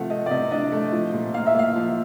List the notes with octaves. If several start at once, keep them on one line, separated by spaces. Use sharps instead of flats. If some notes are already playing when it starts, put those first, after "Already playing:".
Already playing: C3 F3 A3 F5 F#5
A3 D#5
D5
C3 D#5
D4 D#5
A3
F3
A#2
A#3 F5
E5
A#3 F5
F3